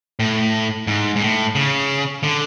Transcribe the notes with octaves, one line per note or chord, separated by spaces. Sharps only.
A2
G#2
G#2
A2
C#3
D3